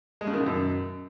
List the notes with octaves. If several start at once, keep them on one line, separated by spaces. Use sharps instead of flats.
G#3
C#3
D#3
B2
F#2